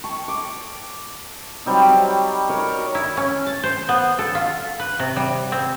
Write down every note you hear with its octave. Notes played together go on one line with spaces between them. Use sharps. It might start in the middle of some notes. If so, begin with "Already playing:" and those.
A5 C#6
D6
F#3 G3 C4 D#4
A#4 C#5 A#5
E4
C#4
A5
C5
B3
A4
F4
B4
C3
G3
C4